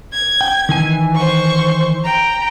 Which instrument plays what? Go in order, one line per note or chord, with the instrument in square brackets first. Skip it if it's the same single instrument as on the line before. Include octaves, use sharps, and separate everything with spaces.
[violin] G#6
[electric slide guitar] G5
D#3 E3 G#5
[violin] C5 C#6
G5 A#5